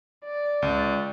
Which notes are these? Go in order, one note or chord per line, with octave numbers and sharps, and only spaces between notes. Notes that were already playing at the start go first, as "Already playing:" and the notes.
D5
C#2